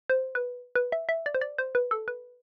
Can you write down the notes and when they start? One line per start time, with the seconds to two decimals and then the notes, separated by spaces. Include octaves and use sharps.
0.10 C5
0.35 B4
0.75 B4
0.92 E5
1.09 E5
1.26 D5
1.34 C5
1.41 D5
1.58 C5
1.75 B4
1.91 A4
2.08 B4